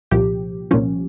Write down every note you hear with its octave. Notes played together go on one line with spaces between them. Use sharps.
C2 A#2 F3 G4
C2 A#2 F3 C#4